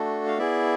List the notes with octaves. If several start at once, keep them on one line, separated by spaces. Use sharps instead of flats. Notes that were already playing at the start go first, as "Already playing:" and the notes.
Already playing: A3 D4 F#4 A4
F5
B3 E4 G#4 D5 E5